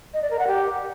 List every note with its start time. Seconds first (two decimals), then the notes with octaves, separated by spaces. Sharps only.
0.14 D#5
0.22 D5
0.30 A#4
0.39 F#5
0.47 G4